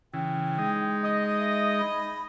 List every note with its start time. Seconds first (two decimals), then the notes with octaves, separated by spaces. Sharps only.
0.14 C#3 E3 G5
0.58 G#3 D#4
1.04 D#5
1.39 E5
1.79 B5